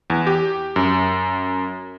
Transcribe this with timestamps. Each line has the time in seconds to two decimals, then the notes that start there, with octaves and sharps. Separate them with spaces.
0.10 E2
0.27 G4
0.76 F#2